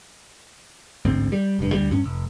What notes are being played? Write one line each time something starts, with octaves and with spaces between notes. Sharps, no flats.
A1 D2 G#2 C4
G3
F1 G2
D2 G3
G2 C#4
F1